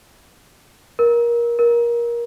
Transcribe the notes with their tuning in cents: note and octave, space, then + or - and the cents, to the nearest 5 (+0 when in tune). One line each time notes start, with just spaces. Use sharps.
A#4 +20
A#4 +20